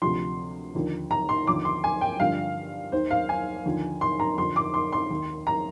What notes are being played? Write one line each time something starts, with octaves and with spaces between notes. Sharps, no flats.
D2 C3 F3 C6
D#2 D3 F3
A#5
C6
D#2 D3 F3 D6
C6
G#5
G5
G2 D3 F3 F5
D#2 D#3 C5
F5
G#5
D#2 D3 F3
C6
A#5
F2 D3 F3 C6
D6
C6
C6
D#2 D#3
A#5